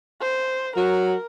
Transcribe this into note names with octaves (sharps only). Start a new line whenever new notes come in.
C5
F#3 F#4 A#4